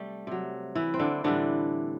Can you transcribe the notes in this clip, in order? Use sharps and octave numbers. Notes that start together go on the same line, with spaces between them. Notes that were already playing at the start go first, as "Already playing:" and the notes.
Already playing: C3 G3 A3 G4 A4
C3 F#3
E3 E4
C4
D3 D4
A2 D3 E3 G3 D4